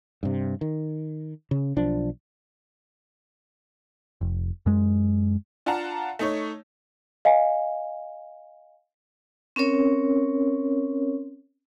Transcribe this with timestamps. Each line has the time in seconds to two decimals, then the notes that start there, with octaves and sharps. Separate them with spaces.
0.23 G2 C3
0.61 D#3
1.51 C#3
1.76 B1 F3 D4
4.21 F1
4.66 F#2 G#3
5.66 D4 F4 F5 F#5 A5 A#5
6.19 A3 D#4 C#5
7.25 D#5 F5 G#5
9.56 C4 C#4 A#4 C#5